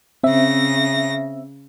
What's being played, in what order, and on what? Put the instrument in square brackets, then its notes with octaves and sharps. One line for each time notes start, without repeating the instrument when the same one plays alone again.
[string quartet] C#3 A#6 [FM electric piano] C4 E5